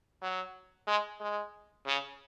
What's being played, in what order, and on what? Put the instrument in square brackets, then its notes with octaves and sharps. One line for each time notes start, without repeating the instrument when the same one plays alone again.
[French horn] F#3
G#3
G#3
C#3